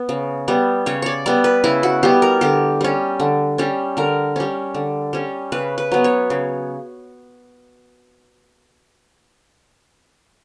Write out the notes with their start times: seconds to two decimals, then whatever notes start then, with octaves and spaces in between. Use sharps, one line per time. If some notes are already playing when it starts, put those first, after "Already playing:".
Already playing: B3
0.09 C#3
0.48 G3 B3
0.86 C#3 C#5
1.02 C#5 D5
1.26 G3 B3 D5
1.44 B4
1.64 C#3 E4
1.83 F#4
2.03 G3 B3 G4
2.22 A#4
2.41 D3 G4
2.81 G3 C#4
3.20 D3
3.58 G3 C#4
3.97 D3 A#4
4.36 G3 C#4
4.74 D3
5.13 G3 C#4
5.52 C#3 B4
5.78 B4
5.92 F#3 B3
6.04 C#5
6.30 C#3